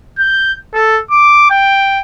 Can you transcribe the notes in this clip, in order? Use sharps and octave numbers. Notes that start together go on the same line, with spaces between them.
G6
A4
D6
G5